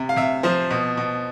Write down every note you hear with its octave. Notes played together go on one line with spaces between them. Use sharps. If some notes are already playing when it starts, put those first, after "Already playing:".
Already playing: C3
F5
C3 E5
F3 C5
B2
B2